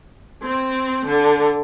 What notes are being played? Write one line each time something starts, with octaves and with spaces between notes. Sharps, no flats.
C4
D3